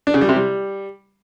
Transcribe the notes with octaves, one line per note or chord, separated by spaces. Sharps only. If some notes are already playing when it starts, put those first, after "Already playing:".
D4
C#3
G3
C3
G3